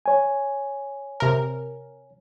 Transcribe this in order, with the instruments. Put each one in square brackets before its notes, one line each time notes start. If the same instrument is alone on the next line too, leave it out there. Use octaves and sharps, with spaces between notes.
[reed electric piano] C#5 G#5
[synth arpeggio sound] C3 A#4